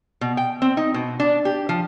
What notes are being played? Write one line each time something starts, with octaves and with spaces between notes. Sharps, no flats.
B2
G5
C4
D#4
B2
D4
G4
F3